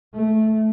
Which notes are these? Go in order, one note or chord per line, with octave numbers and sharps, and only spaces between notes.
A3